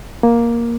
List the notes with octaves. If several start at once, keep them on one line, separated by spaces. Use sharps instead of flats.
A#3